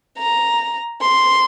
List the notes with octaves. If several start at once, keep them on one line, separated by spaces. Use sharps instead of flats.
A#5
C6